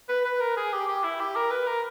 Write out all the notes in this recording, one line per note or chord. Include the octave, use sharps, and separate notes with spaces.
B4
B4
A#4
G#4
G4
G4
E4
G4
A#4
B4
A#4